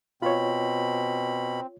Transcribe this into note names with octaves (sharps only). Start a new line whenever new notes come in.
B2 C4 F4 C#5 B5